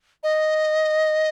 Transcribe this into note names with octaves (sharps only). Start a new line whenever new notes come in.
D#5